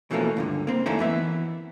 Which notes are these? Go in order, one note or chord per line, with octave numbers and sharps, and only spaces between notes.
B2 E3 F3 A3 A#3 C#4
C#2 G2 D3
A#3 C4
F#2 D#3 A3 A#3 C#4 E4
E3 B3 E5